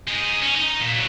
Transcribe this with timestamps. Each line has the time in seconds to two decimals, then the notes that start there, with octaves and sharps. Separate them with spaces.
0.07 G#3 D#4
0.42 C#4
0.56 D#4
0.81 A#2
0.94 D3 F#3